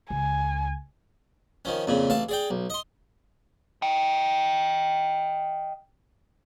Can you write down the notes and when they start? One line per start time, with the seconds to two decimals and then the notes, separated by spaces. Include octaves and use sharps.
0.10 C#2 G#5
1.65 D#3 F3 C#4
1.87 F2 A#2 C#3
2.10 A1 F5 A5
2.29 G#4 D5 G5
2.50 B1
2.70 D#5 C6
3.82 D#5 G5